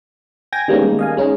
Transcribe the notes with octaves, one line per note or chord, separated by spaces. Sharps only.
G5 G#5 G#6 A#6
D#3 G3 G#3 A#3 B3 C#4
D#5 F5 G#5
G#3 C#4 D#4